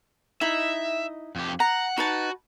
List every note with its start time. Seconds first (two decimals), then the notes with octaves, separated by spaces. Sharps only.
0.41 D#4 E4 D#5 E5
1.36 F2 G4
1.60 F#5 A#5
1.97 D#4 F#4 B4 A5